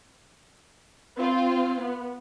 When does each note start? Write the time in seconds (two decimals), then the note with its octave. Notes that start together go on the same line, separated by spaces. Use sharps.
1.18 C4 F4
1.81 B3